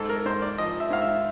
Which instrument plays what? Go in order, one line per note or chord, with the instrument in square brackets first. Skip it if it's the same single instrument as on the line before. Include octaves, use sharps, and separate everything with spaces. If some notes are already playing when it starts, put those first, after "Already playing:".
Already playing: [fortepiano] G#2 A4
A#4
G#2 C5
D5
F3 D#5
E5
G#2 F5
E5